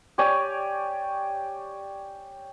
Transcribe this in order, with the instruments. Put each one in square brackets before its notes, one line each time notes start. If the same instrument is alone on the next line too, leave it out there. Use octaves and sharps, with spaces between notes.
[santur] G4 C#5 D5 G#5